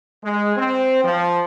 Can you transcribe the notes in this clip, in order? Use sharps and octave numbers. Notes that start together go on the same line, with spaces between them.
G#3
C4
F3